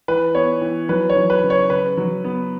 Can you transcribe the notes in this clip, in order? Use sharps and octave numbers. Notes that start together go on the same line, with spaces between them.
E3 B4
B3 C#5
E3
F#3 B4
C#5
F#3
B4
C#3
C#5
C#3 B4
F#3
B3